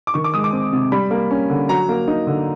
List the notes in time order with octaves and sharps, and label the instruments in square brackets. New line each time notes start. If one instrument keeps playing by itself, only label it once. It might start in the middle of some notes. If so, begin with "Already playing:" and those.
[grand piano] D6
D#3 C#6
D6
G#3 D#6
D6
C4
C3
G3 B5
A#3
C#4
D3
F#3 A#5
A#3
D#4
D3